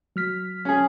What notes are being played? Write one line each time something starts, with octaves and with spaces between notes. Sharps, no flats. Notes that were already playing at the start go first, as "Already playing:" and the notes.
F#3 F6 B6
C#4 G#4